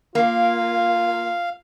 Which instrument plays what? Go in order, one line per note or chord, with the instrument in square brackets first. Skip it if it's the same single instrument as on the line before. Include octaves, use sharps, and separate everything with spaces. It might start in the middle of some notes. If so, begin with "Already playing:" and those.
[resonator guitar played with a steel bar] A#3 [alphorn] F4 [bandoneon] F5